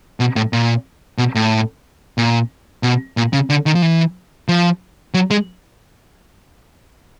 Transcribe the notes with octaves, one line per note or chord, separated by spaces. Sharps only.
B2
A2
A#2
B2
A2
A#2
B2
A#2
C#3
D3
D#3
F3
E3
F3
F#3
G#3